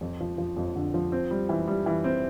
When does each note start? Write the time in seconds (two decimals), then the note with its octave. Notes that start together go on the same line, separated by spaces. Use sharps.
0.01 F2
0.21 F3
0.38 F3
0.57 F2
0.76 D3
0.94 F3
1.12 C4
1.31 G3
1.49 E3
1.67 G3
1.86 E3
2.04 C4